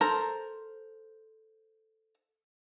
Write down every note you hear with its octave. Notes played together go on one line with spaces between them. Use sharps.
A4 A#4 C5 A#5